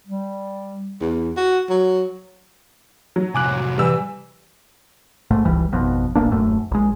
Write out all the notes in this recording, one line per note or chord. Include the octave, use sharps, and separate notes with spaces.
G3
E2
F#4
F#3
F#3
C2 F2 G#5 D6 F#6
E3 G3 E6
A#1 G#2 A3
F#1 C#2 E3 G3
G#1 F2 B2
D1 A1 A#3 D4
D#1 F#2 A3
A#1 G#3